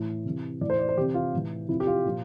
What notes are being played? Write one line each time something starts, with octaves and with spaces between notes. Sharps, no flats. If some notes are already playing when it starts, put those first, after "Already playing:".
Already playing: A2 E3
C3 E3
A2 E3 D5
C5
D5
C5
C3 E3 G4
F4
A2 E3
C3 F3 E4
G4
F4
A#2 F3